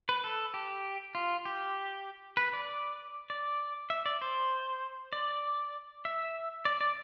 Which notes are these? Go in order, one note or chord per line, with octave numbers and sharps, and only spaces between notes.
B4
A4
G4
F4
G4
B4
D5
D5
E5
D5
C5
D5
E5
D5
D5